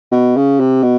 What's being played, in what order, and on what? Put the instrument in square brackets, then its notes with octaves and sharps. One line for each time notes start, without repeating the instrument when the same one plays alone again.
[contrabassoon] B2
C#3
C3
B2